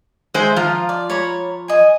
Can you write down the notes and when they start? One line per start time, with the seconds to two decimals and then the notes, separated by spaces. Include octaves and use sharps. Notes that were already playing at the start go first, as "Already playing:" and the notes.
0.34 G#3 C5 E5 G5
0.56 F3 F4 A#5
0.89 D5
1.10 C#5 A#5 B5
1.68 D#5 G#5